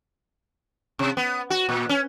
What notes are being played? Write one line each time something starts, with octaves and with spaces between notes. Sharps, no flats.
C3
B3
F#4
A#2
C#4